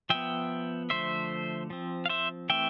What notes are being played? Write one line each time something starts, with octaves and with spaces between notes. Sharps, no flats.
F3 B3 E5 G5
D3 F3 A3 C5 E5
F3 C4
F5
C5 E5
E3 A3 C4 E5 G5